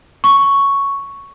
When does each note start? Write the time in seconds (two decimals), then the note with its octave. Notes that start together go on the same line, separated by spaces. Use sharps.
0.24 C#6